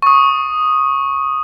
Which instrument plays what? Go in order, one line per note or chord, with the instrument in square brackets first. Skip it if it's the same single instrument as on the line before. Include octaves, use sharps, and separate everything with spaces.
[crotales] C#6 D#6